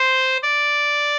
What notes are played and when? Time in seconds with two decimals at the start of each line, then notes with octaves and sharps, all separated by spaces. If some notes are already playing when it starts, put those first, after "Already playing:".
Already playing: C5
0.43 D5